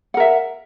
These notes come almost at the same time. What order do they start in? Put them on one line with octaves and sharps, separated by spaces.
F#5 A#4 E5